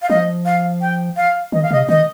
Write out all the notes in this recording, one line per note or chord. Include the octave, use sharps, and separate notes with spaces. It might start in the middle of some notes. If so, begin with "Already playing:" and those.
F5
F3 D#5
F5
G5
F5
D#3 D#5
F5
C3 D#5
D#3 D#5